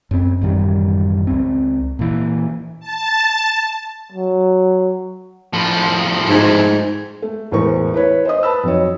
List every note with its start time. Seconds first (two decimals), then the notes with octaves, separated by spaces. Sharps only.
0.11 F#2 C4
0.41 A1 F#2 D#3 G3
1.27 C#2 C4
1.99 A#2 E3
2.80 A5
4.12 F#3
5.53 A2 F3
6.29 G#2
7.22 A3
7.51 E1 E2 A2 A#4 C5 C#6
7.94 E4 B4 C#5
8.25 C5 D#5 D#6
8.43 B4 A5 B5 E6
8.63 F2 F#3 D#4 C#5